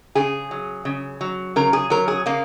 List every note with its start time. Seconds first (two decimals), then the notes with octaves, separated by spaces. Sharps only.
0.15 C#3 G#4
0.51 F#3
0.85 C#3
1.21 F#3
1.56 C#3 A#4
1.73 G#4
1.90 F#3 A#4
2.08 G#4
2.26 C#3 A#3